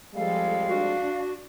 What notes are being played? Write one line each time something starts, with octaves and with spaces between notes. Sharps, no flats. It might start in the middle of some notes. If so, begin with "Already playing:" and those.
F2 F3 G3 G#3 A4 F5
D4 F#4